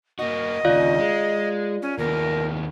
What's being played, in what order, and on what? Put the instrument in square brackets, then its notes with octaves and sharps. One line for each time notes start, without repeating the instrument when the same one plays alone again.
[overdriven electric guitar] A#3 F#4 [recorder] D#5
[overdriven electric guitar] D#2 C#3 [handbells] F4 D5 F5
[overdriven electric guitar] G#3
[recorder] C#4
[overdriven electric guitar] D#2 B3 [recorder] A#4